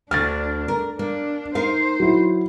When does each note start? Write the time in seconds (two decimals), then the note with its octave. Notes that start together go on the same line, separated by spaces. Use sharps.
0.11 D2 D4 F6 A6
0.68 A#4
0.99 A#3 D4
1.55 D#4 A#4 C5 F5
2.00 F#3 E4